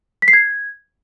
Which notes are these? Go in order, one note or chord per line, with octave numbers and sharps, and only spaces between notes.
B6
C7
G#6